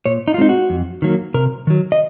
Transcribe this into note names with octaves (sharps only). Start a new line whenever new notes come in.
A#2 C#5
D#4
F4
G#3 C4 D#4
F#4
F2
D#3 F#3 A#3
C3 A#4
D#3 F#3
D#5